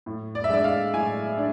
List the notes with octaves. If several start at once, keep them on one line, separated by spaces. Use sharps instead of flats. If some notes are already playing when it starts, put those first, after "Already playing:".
A2
D5
E5
G#3 D4 D5
F5
A2 G#5
D4